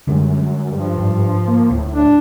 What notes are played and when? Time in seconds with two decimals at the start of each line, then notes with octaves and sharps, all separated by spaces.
0.07 F#2 D3 G3 G#3
0.72 G2 F3
0.97 G#2
1.47 A#3
1.70 D1 A2
1.93 D4